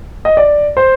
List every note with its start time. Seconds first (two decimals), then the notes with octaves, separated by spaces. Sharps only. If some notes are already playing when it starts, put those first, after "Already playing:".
0.25 D#5
0.37 D5
0.77 C5